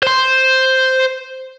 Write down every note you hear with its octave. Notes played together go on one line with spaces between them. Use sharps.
C5 C6